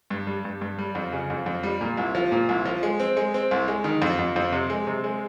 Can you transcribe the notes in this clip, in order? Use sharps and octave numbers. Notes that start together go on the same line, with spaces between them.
G2
G3
G2
G2
G3
F2
C#3
F2
F2
G3
A#2
C2
F3
A#2
C2
F3
G#3
C4
G#3
C4
C2
G#3
D#3
F2
F2
F2
C3
G#3
C3
G#3